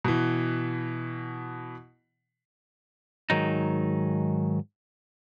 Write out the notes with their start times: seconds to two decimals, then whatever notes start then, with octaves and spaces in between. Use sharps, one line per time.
0.04 B2 E3
3.30 G#2 D#3 F#3 D#4